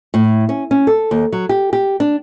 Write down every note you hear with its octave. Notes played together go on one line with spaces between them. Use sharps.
A2
C#4
C#4
A4
D#2
F#3
G4
G4
D4